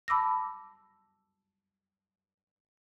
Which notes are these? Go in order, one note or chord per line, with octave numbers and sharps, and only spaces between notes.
A5 B5 D6 E6 A#6